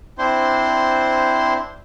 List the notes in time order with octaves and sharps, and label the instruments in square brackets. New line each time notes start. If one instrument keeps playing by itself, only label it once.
[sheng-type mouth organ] C4 D4 E4 C5 C6